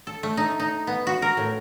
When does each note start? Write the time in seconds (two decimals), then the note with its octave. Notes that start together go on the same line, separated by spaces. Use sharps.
0.07 A4
0.23 A3
0.37 D#4
0.60 D#4
0.87 B3
1.07 F#4
1.22 A#4
1.37 A2